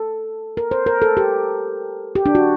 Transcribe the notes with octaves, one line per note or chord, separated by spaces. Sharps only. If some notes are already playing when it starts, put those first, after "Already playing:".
Already playing: A4
A#4
C5
A#4
A4
G4
G4
D4
F#4